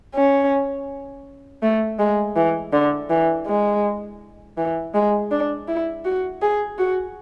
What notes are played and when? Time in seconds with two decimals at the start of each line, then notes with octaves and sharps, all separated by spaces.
0.15 C#4
1.62 A3
1.99 G#3
2.36 E3
2.73 D3
3.10 E3
3.47 G#3
4.58 E3
4.94 G#3
5.31 D4
5.68 E4
6.05 F#4
6.42 G#4
6.78 F#4